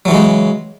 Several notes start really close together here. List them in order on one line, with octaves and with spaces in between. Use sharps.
F#3 E3 C#3 G#3